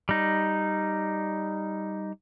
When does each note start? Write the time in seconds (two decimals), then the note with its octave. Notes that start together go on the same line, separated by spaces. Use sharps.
0.09 G3 D#4